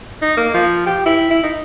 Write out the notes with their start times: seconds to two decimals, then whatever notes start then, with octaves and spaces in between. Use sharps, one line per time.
0.22 D#4
0.37 A#3
0.54 F3
0.87 G4
1.06 E4
1.31 E4
1.44 D#4